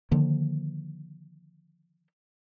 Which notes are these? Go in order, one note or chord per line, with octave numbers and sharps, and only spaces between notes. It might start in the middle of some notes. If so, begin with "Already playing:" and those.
D3 D#3 F3 A#3